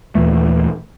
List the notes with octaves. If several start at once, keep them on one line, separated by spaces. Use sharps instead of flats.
D#2 A#2 E3 A3